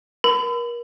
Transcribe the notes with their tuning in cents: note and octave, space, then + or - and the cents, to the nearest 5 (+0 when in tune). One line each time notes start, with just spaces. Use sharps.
A#4 +35 B5 +40